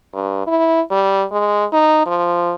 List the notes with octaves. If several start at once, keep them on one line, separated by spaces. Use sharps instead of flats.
G2
E4
G3
G#3
D#4
F3